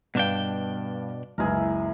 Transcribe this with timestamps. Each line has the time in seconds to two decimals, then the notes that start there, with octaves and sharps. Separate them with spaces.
0.15 G2 B2 D4 F5 G5
1.38 F#1 C#2 E4 G#4 A#4